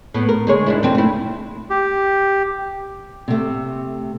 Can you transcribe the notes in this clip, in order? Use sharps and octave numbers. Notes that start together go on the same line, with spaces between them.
A2 B3
A#4
D2 G#3 C#5
G#2 D4 E4
F2 C4
A3 E4
G4
C3 A3